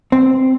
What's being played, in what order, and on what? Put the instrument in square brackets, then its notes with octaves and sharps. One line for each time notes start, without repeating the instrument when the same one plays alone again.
[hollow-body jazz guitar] C4